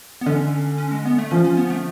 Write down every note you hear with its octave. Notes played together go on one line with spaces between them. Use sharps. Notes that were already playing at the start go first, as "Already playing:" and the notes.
B3
D3 C#4
C#4
G#3
B3
A3
F3 C#4
C#4
B3
A3